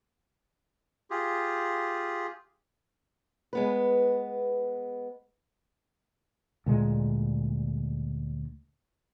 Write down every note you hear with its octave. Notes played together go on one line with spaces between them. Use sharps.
F4 G4 G#4
G#3 B3 B4
D2 A#2 G#3